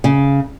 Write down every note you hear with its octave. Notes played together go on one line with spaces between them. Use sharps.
C#3